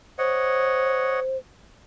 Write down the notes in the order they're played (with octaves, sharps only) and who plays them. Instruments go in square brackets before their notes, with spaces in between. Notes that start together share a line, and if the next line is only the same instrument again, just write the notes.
[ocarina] C5 [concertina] C#5 D#5 F#5